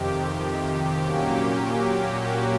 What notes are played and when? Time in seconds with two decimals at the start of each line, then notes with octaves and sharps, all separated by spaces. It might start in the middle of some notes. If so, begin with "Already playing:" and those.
Already playing: F2 C3 D#3 G4
1.03 A#2 F#3 A#3 C#4 G4
1.74 G4
2.10 F#4